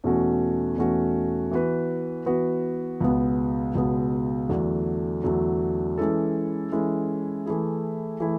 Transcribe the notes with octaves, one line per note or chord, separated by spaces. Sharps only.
E2 B2 A3 C#4 F#4
E2 B2 A3 C#4 F#4
E3 B3 F#4 B4
E3 B3 F#4 B4
C#2 B2 G#3 B3
C#2 B2 G#3 B3
E2 D3 F#3 A3 D4
E2 D3 F#3 A3 D4
E3 G#3 C#4 E4 A4
E3 G#3 C#4 E4 A4
E3 A3 E4 G#4
E3 A3 E4 G#4